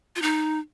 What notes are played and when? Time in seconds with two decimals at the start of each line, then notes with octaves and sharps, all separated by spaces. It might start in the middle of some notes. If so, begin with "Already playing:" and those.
0.16 F4
0.22 D#4